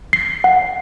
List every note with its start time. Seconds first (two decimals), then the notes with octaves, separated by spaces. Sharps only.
0.13 C7
0.44 F#5